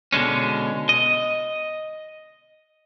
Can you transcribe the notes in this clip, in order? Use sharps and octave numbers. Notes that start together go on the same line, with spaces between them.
B2 D3 G#3 C#4
D#5